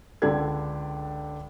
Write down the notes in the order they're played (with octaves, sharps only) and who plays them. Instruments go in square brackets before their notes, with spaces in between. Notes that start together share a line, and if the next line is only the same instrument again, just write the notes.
[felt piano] C#2 D3 D4 G4 A4 G#6